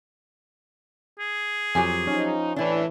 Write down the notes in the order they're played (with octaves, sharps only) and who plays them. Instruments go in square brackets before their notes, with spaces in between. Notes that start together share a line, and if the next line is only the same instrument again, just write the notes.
[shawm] G#4
[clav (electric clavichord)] F2 [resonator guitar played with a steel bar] F#3 G4 G#5
[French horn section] F3 D#4 [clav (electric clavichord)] C#4
[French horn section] A2 E3 [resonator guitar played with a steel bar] D4 E4